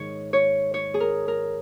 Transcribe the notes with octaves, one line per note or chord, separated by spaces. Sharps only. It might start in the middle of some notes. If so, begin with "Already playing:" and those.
Already playing: G#2 D#3 C#5
C#5
C#5
G#4
A#4
A#4